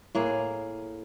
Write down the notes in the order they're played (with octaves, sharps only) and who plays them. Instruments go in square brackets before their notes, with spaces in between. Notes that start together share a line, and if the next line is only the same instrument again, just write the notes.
[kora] A2 A#3 G#4